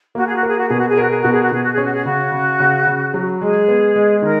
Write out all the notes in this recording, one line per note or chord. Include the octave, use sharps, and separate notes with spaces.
A#3 F#4
G#4
F#4
G#4 A#4
F#4
B2 G#4
F#4
G#4
F#4 A#4
G#4
B2 F#4
G#4
F#4
B2 G#4
F#4
G#4
C#4
F#4
G#4
C#3 F#4
C#3
C#3
C#3
F#3
G#3 G#4
B3
G#3
D#3 A#4